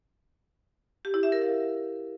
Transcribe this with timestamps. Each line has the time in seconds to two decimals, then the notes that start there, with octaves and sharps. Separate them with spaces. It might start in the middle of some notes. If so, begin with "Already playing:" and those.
1.05 G4
1.14 E4
1.23 E5
1.32 A#4
1.41 F5